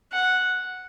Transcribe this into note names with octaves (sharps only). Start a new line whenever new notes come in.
F#5